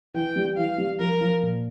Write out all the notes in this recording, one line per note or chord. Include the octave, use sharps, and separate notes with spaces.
E3 G5
G3
E3 F5
G3
F3 A#4
F3
A#2